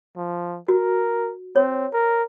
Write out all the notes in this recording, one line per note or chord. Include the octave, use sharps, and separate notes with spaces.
F3
F#4 A#4
C4 C#5
A#4